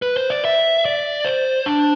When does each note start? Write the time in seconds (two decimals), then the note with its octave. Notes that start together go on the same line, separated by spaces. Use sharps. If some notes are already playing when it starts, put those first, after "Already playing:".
0.02 B4
0.17 C5
0.30 D5
0.45 E5
0.85 D5
1.25 C5
1.66 D4